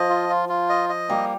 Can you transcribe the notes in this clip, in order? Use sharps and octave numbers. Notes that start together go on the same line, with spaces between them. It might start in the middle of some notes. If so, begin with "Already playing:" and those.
Already playing: F3 D#5
F4
F4
F4
D#5
D#5
G3 A#3